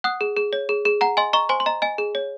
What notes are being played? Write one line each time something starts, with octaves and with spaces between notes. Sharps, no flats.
F#5 D#6 F#6
G#4
G#4
C#5
G#4
G#4
F#5 A#5
D#5 G#5 C6
D#5 A#5 C#6
C5 G#5 C6
C6
D#5 A#5
D#5 G#5
G#4
C#5